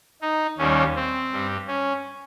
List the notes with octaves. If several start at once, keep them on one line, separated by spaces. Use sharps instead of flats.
D#4
D#2 D#3 G3 C#4
C4
G2 G3
C#4